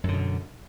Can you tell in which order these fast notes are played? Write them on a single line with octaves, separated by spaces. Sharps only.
F#2 D3 B2